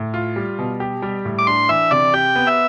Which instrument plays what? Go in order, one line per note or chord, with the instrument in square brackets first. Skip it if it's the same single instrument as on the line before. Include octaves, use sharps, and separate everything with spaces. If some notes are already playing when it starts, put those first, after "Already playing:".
Already playing: [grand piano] A2
F4
G3
B2
G4
G3
A2
[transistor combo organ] D6
[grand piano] D4 [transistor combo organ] C6
[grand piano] E3 [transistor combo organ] E5
[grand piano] C3 [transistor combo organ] D5
[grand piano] G4 [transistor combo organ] G5
[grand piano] B3
[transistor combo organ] E5